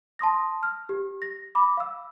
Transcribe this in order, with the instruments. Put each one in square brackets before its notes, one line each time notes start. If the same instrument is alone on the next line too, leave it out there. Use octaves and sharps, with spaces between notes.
[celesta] A5 C6 D#6 A#6
F6
G4
A#6
B5 D6
F5 E6